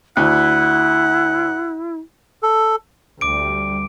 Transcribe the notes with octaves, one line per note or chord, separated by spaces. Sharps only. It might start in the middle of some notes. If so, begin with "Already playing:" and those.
D2 E4 F#5
A4
D2 G3 D6 D7